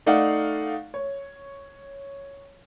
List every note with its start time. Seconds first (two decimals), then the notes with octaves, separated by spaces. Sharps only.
0.06 A3 D#4 D5 F5 F#5
0.94 C#5